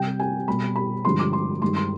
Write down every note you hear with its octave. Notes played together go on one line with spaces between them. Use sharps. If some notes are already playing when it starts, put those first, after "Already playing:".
Already playing: C3 G3 G5
G#5
B2 G3 B5
B5
G2 D3 F3 G#3 C6
D6
C6
G2 D#3 G#3 C6
C6